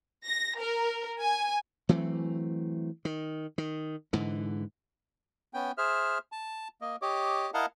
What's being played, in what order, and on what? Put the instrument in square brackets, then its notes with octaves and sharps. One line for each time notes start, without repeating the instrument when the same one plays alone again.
[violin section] A#6
A#4
G#5
[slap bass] E3 F#3 A3 C4
D#3
D#3
G#2 D3 E3
[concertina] B3 C#4 G5
G#4 C5 E5 F6
A5
A#3 D#5
G4 C#5 D#5 D6
E4 A#4 D#5 F5 F#5 A5